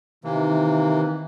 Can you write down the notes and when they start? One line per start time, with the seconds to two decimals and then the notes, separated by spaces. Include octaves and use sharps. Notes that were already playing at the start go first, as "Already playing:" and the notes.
0.24 C3 D#3 E3 A#3